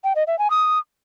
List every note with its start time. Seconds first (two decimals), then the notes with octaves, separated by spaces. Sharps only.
0.04 G5
0.16 D#5
0.27 E5
0.39 G#5
0.50 D#6